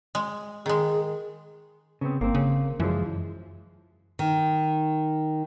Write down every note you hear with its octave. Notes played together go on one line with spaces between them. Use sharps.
G#3
D#3 G#3 G#4
C#3 B3 C4
G1 A#3 C4
C#3
F#2 E3 F3 G#3
D#3